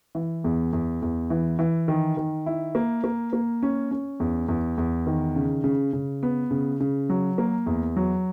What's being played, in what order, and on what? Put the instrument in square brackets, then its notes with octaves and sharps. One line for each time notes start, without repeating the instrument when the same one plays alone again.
[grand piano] E3
E2
E2
E2
E3
E3
D#3
D#3
E4
A#3
A#3
A#3
C#4
C#4
E2
E2
E2
D#3
C#3
C#3
C#3
B3
C#3
C#3
F#3
A#3
E2
F#3